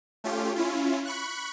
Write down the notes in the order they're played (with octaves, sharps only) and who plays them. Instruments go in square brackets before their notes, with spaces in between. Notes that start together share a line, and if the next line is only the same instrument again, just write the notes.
[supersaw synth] A3 C#4 F4 G4
C#4 E4 F4
B5 C#6 F#6